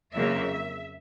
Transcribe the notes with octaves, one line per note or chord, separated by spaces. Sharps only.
F2 C#3 F#3 A#3 E5